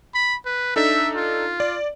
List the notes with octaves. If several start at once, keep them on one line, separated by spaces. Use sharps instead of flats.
B5
B4
D4 D#4 A4 E5
F4
D5